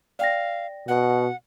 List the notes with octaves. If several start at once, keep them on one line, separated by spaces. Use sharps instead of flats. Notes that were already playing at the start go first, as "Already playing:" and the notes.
D5 F5 G5 A#6
B2 F#5